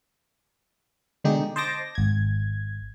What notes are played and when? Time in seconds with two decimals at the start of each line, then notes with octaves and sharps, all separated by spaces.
1.24 B2 D3 G#3 D#4 G4
1.56 C5 D#5 A5 C6 D6 A#6
1.95 G#1 G#6